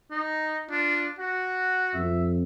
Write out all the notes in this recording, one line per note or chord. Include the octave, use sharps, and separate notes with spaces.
D#4
D4 F4
F#4 F#5
F2 E5